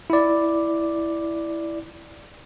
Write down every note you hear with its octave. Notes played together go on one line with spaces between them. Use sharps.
E4 D5